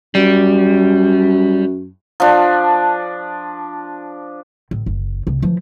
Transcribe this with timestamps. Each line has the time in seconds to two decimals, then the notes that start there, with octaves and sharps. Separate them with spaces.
0.15 F#2 G3
2.20 F3 D4
4.71 A1
4.86 F#1
5.27 C2
5.42 E3 F3